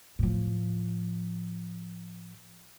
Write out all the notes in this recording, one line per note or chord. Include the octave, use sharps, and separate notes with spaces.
A2 F3